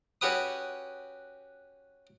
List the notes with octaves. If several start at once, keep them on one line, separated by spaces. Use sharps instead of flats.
C#4 F#4 G4 B4 D#6